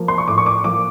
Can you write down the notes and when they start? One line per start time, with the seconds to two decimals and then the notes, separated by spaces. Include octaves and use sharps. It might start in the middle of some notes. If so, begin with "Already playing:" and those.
Already playing: F3 A#3
0.08 C6
0.18 C#6
0.28 A2 D6
0.38 C#6
0.46 D6
0.64 F3 A#3 D6